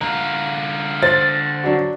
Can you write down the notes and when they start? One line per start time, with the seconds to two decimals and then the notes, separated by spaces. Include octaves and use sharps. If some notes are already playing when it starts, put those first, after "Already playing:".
0.01 D3 F4 A#5
1.02 C5 A6
1.64 F#3 D4 F#4